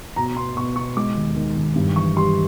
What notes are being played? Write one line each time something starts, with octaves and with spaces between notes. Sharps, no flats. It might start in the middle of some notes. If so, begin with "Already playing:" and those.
B2 A#5
B3 C6
B2 C#6
B2 C#6
G#3 D6
D#2
D#3
D#3
G2
E3 C#6
G3 C6